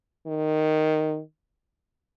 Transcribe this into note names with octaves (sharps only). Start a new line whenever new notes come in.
D#3